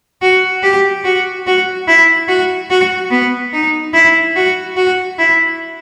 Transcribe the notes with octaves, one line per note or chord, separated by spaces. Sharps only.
F#4
G4
F#4
F#4
E4
F#4
F#4
B3
D#4
E4
F#4
F#4
E4